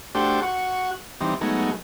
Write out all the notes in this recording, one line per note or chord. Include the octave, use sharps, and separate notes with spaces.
A3 D4 F#4 G4 C5 G5
F#4 F#5 C#6
E3 G3 C4 D#4
F#3 G#3 A3 B3 D#4